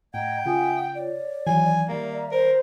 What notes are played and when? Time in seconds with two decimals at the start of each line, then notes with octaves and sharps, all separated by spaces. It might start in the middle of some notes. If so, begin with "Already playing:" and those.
0.14 A2 D#5 F#5 G5 A#5 G#6
0.46 C#3 F4 E5 G#5 D#6
0.95 C#5 D5
1.47 D#3 E3 F#3 G#5
1.89 D#3 G3 A#3 E5 A#5
2.31 A#4 C5